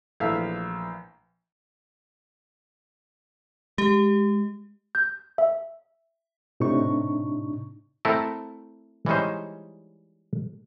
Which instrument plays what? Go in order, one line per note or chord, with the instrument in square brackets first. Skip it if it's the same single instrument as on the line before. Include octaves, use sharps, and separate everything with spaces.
[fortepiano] A#1 E3 A3 E5 F5 E6
[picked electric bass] G#3 [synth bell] G4
[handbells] G6
E5
[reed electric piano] A2 C3 D4 D#4 C#6
[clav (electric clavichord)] A3 C4 E4 A4 A#4
E3 G3 G#3 C#4 D#4 C5